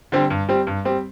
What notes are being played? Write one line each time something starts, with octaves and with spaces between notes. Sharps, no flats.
D3 G3 C4 G4
G2
G3 C4 G4
G2
G3 C4 G4